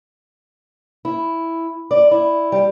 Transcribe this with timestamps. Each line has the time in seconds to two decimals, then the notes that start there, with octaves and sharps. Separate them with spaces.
1.05 E4
1.91 D5
2.11 E4
2.52 G3